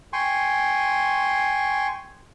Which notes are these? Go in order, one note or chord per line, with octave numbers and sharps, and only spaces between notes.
G5 G#5 C6 C#6